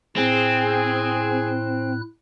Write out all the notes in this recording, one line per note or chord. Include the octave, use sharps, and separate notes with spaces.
A2 C4 E4 G#4 F#6